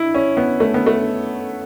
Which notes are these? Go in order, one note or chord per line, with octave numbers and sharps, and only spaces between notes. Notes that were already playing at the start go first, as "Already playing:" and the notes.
Already playing: E4
C#4
B3
A3
B3
A3